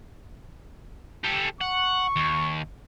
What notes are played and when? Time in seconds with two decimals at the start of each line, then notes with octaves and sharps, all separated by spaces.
1.24 G4 A4
1.61 F#5 C#6
2.16 D#2